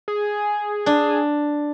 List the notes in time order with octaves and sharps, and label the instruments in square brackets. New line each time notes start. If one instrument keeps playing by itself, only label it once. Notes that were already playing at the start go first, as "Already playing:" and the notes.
[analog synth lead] G#4
[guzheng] D4